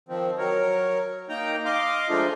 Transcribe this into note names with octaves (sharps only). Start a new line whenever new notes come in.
D#3 F3 C4
F#3 A#4 C#5
A#3 D#4 G5 A#5
D#5 F5 C6 D6
F3 G#3 A3 D4 D#4 F4